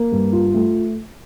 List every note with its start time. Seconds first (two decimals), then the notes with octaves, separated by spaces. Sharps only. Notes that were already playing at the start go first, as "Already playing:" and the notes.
Already playing: A#3
0.12 G2
0.33 F4
0.54 A3